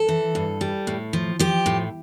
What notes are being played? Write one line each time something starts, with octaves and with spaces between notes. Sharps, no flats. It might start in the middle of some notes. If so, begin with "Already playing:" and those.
Already playing: A4
E3
G2
G3
A2
F3
F3 G4
A2